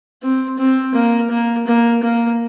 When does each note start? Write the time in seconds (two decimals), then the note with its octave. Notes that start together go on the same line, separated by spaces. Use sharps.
0.23 C4
0.59 C4
0.95 A#3
1.31 A#3
1.67 A#3
2.03 A#3